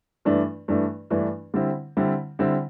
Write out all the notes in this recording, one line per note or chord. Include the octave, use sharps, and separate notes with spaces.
G2 E3 A3 D4
G2 E3 A3 D4
G2 E3 A3 D4
D3 G3 C4 E4
D3 G3 C4 E4
D3 G3 C4 E4